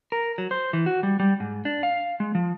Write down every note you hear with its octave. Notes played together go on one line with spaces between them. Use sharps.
A#4
F#3
C5
E3
F#4
G3
G3
G#2
D4
F5
G#3
F3